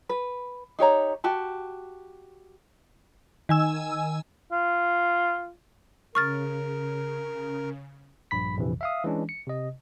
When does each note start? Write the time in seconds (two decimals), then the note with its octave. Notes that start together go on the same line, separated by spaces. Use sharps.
0.09 B4
0.79 D#4 G4 C#5 A#5
1.24 F#4 G4 A5
3.49 D#3 G#5 E6
4.52 F4
6.15 C#3 A#4 C#6 F6 A6
8.31 A#1 G2 B5 B6
8.56 A#1 F2 C3 E3
8.81 E5 F5 D#6
9.04 E3 G#3 C#4 D4
9.29 C#7
9.47 C3 D#5